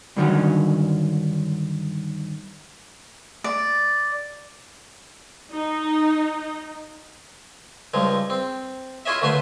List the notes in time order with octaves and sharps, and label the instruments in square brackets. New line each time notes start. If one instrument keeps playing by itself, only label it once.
[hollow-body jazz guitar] G2 D3 D#3 F3 F#3 C#4
[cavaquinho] D5
[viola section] D#4
[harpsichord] C#2 G2 F3 G#3
C4
E4 F4 G#4 C#5 D#5 E5
D2 C#3 A3 B4 E5 C6